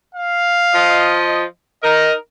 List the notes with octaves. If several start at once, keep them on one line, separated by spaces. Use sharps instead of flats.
F5
F3 D#5
D#4 A#4 D#5